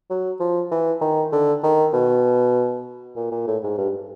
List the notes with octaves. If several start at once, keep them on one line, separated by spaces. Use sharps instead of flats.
F#3
F3
E3
D#3
D3
D#3
B2
A#2
A#2
A2
G#2
G2